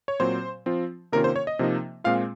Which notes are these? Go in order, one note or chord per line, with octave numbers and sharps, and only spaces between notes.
C#5
A#2 F#3 C4 C5
F3 C4 F4
C3 D#3 A#3 C#4 F4 A#4
C5
C#5
D#5
C3 F3 A#3 D#4
A#2 G#3 C4 F4 F5